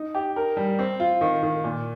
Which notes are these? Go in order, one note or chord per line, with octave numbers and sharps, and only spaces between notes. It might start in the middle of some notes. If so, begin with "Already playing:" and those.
Already playing: D#4
G4
A#4
G3
C4
F4
D#3
D#3
A#2